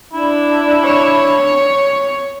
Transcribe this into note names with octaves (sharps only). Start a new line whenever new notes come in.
D4 E4
C#5